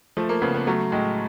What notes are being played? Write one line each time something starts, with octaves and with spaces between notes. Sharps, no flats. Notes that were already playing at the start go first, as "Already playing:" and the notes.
F3 A3
A#3
C#3 B3
B3
F#3 A3
A2 G#3